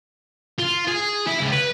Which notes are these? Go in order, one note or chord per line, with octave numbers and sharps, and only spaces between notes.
F4
G#4
E4
C#2
B4